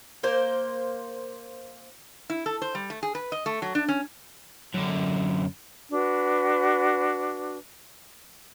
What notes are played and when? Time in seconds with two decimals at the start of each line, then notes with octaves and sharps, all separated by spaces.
0.23 A#3 C5
2.30 E4
2.46 A4
2.62 C5
2.75 G3
2.90 A3
3.03 G#4
3.15 B4
3.32 D#5
3.46 A3
3.62 F#3
3.75 D4
3.88 C#4
4.74 F#2 D3
5.91 D4 F#4 B4